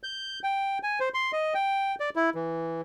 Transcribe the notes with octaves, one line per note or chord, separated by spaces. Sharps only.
G6
G5
G#5
C5
C6
D#5
G5
D5
E4
E3